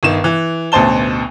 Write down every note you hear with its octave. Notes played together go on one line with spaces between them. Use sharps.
G1 D#3 E7
E3
A1 D2 B2 C5 A5 G7